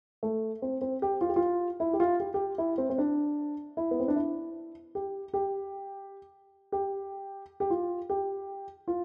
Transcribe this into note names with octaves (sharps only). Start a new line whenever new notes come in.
A3
C4
C4
G4
F4
G4
F4
E4
G4
F4
G4
G4
E4
C4
C4
D4
E4
B3
C4
D4
E4
G4
G4
G4
G4
F4
G4
F4